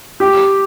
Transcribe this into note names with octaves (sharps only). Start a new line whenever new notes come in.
G4